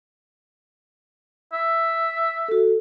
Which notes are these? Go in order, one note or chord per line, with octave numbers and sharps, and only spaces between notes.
E5
F#4 A4